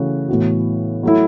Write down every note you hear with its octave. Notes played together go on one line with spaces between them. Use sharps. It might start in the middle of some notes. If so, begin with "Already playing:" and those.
Already playing: C#3 E3 A3 C#4 F#4
A2 E3 B3 F#4
F#3 A3 E4